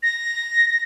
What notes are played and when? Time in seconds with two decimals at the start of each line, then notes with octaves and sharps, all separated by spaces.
0.03 A#6
0.70 A#6